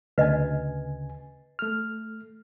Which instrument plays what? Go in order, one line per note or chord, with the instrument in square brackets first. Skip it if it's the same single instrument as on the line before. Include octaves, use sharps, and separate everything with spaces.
[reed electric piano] D2 C#3 G#5 [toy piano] B4 D#5
[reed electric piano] A3 F6